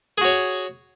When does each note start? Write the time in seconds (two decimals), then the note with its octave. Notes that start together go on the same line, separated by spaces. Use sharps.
0.18 G#4
0.21 F#4
0.25 C#5